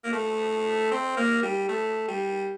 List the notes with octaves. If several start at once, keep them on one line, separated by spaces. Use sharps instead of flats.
A#3
A3
C4
A#3
G3
A3
G3